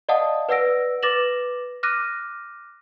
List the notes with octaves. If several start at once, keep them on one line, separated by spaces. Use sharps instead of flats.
D5 D#5 F5 F#5 A5 D#6
B4 D5 F#5 E6 A#6 D7
B4 D6 A6 A#6 E7 F#7
D6 F6 F#6 A#6 D#7